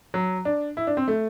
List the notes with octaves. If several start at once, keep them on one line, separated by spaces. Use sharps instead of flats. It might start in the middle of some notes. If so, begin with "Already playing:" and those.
F#3
D4
E4
D4
C4
A3